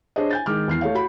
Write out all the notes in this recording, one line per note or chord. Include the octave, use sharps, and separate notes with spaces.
D4 G#4 C5 C#5 D#5
G#5 G6 A6
D#3 G#3 D6 F6
E2 F6 C7
A3 C#5 F5
F#4 B5